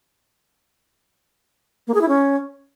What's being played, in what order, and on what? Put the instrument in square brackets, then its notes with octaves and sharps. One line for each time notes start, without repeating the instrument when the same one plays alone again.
[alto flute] A#3
G#4
E4
C#4